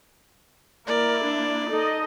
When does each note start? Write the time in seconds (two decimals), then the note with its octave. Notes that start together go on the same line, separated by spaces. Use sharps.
0.87 A#3 E4 A#4 D5
1.24 D4
1.69 D#4 A4 D#5